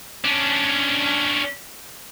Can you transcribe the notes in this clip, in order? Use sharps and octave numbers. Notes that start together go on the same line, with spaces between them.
C#4 D4